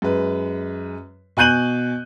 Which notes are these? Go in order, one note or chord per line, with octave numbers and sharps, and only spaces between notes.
F#2 G#3 B4
B2 G#5 F#6 G6 D#7 F#7